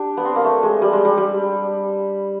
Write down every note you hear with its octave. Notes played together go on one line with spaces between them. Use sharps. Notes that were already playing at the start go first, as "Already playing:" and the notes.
Already playing: D4 G4
B3
C4
A#3
A3
G#3
G3
G#3
G3
G3